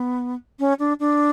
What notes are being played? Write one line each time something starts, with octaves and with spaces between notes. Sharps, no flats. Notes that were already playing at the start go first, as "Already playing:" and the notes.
Already playing: B3
C#4
D4
D4